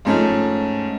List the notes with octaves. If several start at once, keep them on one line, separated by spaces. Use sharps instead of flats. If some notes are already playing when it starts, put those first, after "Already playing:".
G#2 F3 A3 C#4